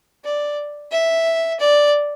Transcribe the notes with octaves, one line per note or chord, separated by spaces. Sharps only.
D5
E5
D5